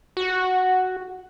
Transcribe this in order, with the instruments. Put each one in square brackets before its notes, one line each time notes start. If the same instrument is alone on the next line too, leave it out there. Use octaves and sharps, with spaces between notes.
[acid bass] F#4